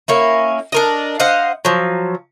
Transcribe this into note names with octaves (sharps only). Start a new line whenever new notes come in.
A#3 C#4 E4
D4 A#4 D#5
C5 D#5 F5 F#5
F3 F#3